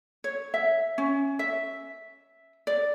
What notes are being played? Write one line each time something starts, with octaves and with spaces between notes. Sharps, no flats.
C#5
E5
C#4
E5
D5